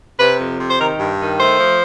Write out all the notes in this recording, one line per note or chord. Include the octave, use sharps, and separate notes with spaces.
C3 B4
F2
C3
C5
D#3 A#4
G2
D#3
A3 C5
F3